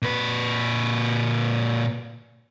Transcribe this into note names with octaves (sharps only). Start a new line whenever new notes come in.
A#2 B4